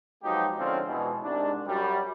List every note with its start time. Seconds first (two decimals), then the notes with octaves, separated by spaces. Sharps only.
0.24 F3 F#3 G#3 B3 D#4 G4
0.58 G#2 D3 F3 C4 C#4 F4
0.88 B2 E3 G#3
1.23 C2 G#2 D4
1.67 F#2 G3